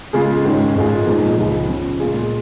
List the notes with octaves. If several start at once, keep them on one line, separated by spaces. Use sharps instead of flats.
C#3 G#3 F4 G#4
G#2 D#3 G#3 C#4
G#1 G#2 G#3 F4 G#4
A#2 F3 G#3 D#4 G#4
C#2 C#3 F3 G#3
C#3 F3 C#4
A#2 G#3 F4 G#4